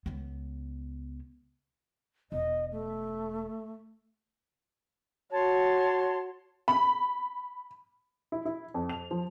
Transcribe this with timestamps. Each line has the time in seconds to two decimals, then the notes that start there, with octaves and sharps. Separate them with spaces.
0.06 C#2 B3
2.32 E1 D#5
2.72 A3
5.33 F#4 C#5 A5 C6
6.68 B5
8.32 E4
8.45 E4
8.74 F2
8.90 F7
9.11 F3